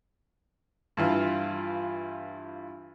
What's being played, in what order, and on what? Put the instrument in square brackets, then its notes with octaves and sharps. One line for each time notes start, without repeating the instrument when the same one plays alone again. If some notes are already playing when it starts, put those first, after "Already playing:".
[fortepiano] G2 E3 F4